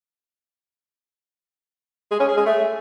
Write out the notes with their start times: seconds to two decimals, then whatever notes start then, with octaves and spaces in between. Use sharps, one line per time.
2.11 G#3
2.20 C#4
2.28 G#4
2.37 G#3
2.45 A3